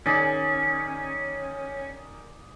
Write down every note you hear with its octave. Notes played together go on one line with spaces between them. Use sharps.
D#3 C#4 G#4 D5